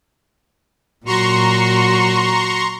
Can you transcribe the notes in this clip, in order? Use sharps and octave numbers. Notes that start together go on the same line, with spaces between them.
A#2 F#3 F#4 A#5 C6 C#6